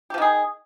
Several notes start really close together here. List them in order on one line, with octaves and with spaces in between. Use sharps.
G4 F3 D#3 G#4